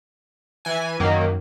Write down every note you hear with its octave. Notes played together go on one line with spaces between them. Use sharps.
E3 G#5
F#2 D#3 F#3 A#3